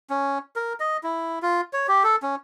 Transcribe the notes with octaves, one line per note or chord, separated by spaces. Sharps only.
C#4
A#4
D#5
E4
F4
C#5
G4
A4
C#4